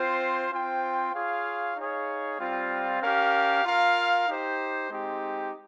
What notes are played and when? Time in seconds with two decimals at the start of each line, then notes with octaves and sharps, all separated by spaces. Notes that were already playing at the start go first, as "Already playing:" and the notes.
Already playing: C4 F4 C5
0.52 C4 F4 C5 G5
1.14 F4 G#4 C#5 F5
1.77 D#4 G#4 C#5 F5
2.40 G3 C4 F4
3.02 C#4 G4 A#4 F5
3.65 F4 A#4 F5
4.28 D#4 G4 C5
4.90 G#3 C4 D#4 G4